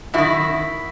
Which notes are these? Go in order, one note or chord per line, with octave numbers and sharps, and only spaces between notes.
F#2 D#3 E4 F#4